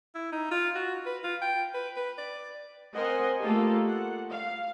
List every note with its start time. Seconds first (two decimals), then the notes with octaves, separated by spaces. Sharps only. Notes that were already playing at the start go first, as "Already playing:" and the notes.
0.15 E4
0.32 D#4
0.51 F4
0.75 F#4
1.06 B4
1.24 F4
1.42 G5
1.74 B4
1.96 B4
2.18 D5
2.93 C4 A#4 C5 D#5 F#5 G#5
3.42 A3 A#3 F4 G4 A4
3.86 F#5
4.32 F5